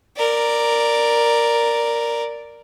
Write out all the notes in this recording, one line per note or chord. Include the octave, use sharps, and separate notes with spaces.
A#4 D5